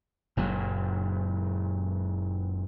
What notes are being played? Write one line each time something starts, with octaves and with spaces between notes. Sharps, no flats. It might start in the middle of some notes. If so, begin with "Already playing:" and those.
F#1 A#2 F#3